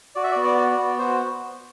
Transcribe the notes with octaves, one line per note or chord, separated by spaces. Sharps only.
F#4 D5
E5
D5
B3
D5
F#4
D5
B3
F#4 C5